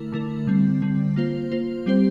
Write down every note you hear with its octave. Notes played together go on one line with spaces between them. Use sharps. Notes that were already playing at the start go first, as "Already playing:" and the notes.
Already playing: D3 A3 E4 A#4
D3 A3 E4 A#4
D3 G3 C4
D3 G3 C4
A#3 F4 C5
A#3 F4 C5
G3 C4 G4 C5